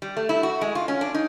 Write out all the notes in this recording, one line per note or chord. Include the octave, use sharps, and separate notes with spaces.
G3
A3
E4
F#4
G#3
F4
C#4
D4
D#4